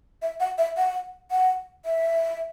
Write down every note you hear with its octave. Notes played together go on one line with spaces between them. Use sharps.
E5
F#5
E5
F#5
F#5
E5